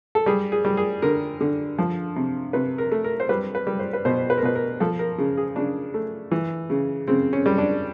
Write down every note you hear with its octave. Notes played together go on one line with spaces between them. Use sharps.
A4
G3 G#4
G#4
G3
G#4
D3 A#4
D3
F3
C3
C3 B4
A#4
A3
A#4
C5
G3 B4
B4
G3
C5
B4
B2 C5
B4
A#4
B2 B4
A#4
F3 A4
A#4
C#3
G#4
C#3 D4
A3
E3
C#3
C#3 C4
C#4
G3
D4